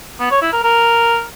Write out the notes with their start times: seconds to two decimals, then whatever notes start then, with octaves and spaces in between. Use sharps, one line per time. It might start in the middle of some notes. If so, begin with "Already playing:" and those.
0.20 B3
0.31 C#5
0.42 E4
0.52 A#4
0.63 A#4